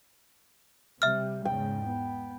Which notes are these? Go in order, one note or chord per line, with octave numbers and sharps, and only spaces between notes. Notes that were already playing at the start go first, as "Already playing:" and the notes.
C3 G3 E5 F6
E2 G#2 C#3 G5
B3